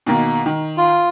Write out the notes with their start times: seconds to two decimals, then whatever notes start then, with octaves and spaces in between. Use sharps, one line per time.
0.07 B2 D#3 A#3
0.46 D#3
0.77 F4